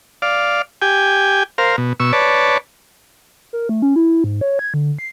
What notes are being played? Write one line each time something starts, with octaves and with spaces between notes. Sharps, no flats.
D5 F5
G4 G5 G#5
A#4 C5 F5
B2
B2 C#6 E6
B4 C#5 D5 A5
A#4
A3
C#4
E4
G#2
C#5
G#6
D3
C7